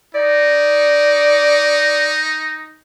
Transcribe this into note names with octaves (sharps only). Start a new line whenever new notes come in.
D#4 D5